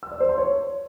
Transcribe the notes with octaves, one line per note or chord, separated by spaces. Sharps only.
E6
D5
C5
C6
C#5